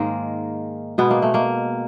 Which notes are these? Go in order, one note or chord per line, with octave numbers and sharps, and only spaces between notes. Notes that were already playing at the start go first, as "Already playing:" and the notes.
Already playing: G#2 D#3 G#3 A#3
B2 G#3 B3
A#3
A3
A#3